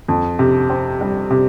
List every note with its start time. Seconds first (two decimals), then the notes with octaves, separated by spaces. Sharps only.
0.08 F2
0.39 C3
0.70 C4
1.01 G3
1.30 C3